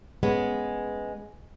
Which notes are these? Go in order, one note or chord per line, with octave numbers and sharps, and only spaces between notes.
G#3 B3 C#4